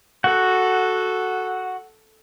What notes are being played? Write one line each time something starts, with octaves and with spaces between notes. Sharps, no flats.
F#4 A4 F#5